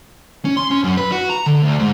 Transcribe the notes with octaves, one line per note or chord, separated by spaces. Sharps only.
C#4
C6
C#4
F#2
B4
F#4
A#5
D3
D2
G#2